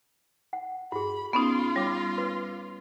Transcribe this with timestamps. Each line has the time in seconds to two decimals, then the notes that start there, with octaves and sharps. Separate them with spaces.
0.53 F#5
0.92 G2 F#4 G#4 B5
1.33 B3 C#4 D#4 F4 D5 B5
1.76 G3 C#5 D6
2.18 B4